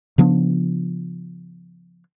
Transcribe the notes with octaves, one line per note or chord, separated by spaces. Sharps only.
C#3 F3 B3 D4